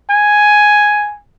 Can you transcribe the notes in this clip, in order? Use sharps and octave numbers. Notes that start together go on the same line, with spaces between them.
G#5